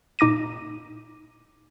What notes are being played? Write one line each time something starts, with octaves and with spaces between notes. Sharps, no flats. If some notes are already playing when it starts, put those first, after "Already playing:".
A#2 D#4 D6 A#6 D#7